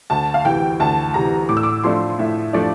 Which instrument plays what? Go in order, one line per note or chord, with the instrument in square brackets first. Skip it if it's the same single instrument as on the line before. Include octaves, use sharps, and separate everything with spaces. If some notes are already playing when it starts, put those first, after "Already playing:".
[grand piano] D2 [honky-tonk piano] A5
[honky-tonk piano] F5
[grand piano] C3 E3 [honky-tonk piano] G5
[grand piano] D2 [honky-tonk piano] A5
[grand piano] C3 E3 [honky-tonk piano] A#5
[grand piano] A2 [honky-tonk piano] D6
[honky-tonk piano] E6
D6
[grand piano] F3 A3 D4 [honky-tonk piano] C6
[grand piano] A2 [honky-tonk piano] E5
[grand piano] F3 A3 D4 [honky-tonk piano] D5